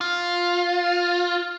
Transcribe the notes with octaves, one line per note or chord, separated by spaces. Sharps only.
F4